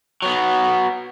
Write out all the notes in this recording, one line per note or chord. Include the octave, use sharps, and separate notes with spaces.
F#3 B3